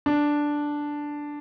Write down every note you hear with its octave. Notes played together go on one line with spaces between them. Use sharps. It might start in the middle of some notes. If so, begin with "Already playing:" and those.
D4